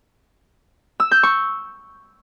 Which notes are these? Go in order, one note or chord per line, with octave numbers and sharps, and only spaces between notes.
E6
G6
C#6